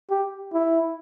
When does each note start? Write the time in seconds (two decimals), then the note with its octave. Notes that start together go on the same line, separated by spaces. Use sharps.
0.10 G4
0.53 E4